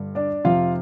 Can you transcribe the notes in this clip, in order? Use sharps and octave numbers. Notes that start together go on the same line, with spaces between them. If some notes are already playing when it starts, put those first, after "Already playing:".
Already playing: G1 G2 D3 G3
D4 D5
F1 F2 C3 F4 F5